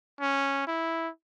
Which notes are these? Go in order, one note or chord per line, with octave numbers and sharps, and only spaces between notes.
C#4
E4